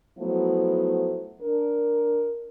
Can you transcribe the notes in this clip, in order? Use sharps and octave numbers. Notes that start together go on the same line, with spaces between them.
F3 F#3 A3 B3 E4
D4 A#4